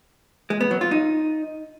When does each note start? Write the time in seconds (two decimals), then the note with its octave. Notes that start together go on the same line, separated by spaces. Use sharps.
0.50 G#3
0.61 B3
0.71 F#3
0.81 F4
0.91 D#4